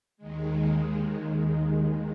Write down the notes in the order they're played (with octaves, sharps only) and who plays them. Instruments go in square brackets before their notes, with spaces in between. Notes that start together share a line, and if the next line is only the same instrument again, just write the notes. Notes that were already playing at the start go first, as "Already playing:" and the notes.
[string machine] D#2 D#3 G#3